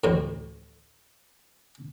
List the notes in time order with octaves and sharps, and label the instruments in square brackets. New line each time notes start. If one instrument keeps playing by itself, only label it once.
[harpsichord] A1 D2 A2